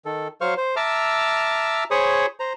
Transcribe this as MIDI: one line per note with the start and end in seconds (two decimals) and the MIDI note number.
0.05 0.28 51
0.05 0.28 69
0.41 0.54 54
0.41 0.54 72
0.41 0.54 77
0.41 0.54 85
0.41 0.54 89
0.57 0.75 72
0.76 1.84 76
0.76 1.84 81
0.76 1.84 82
0.76 1.84 86
0.76 1.84 88
0.76 1.84 89
1.91 2.26 68
1.91 2.26 72
1.91 2.26 73
1.91 2.26 83
1.91 2.26 85
1.91 2.26 87
2.40 2.53 72
2.40 2.53 82